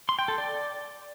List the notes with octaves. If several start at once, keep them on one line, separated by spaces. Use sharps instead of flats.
C6
G5
A4
D5